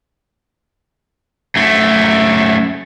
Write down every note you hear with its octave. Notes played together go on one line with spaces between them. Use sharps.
F#2 A3